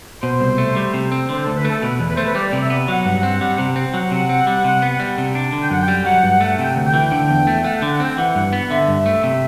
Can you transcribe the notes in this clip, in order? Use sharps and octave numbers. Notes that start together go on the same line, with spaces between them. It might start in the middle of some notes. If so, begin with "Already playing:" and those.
B2 C5
C2
A3
G3
C3
C4
D3 C5
D2 A4
B4
A3 A4
B2 B4
E2
B4
A3 C5
B4
G3 D5
D5
C3
E5
B3
F#3 F#5
G2
C4
G3
C3
C4
F#3 F#5
C3
C4
G3
C3
B3
G3
C3
D4
D3
G5
F#2 F#5
G5
G3
F#3 F#5
G2
A3
C3 G5
D2
G5
E3
D3
E2
A3
A3 F#5
D3 G5
F#5
C4 G5
E3 F#5
G2
B3
D3 E5
G2
A3
C3